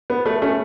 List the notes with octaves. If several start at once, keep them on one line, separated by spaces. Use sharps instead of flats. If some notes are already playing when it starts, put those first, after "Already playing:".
B3
A3
A3 C#4